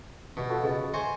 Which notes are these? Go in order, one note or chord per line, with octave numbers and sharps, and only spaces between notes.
B2
F4 F#4 A4
C#3 G#4 B4 D#5
C5 E5 G#5 C#6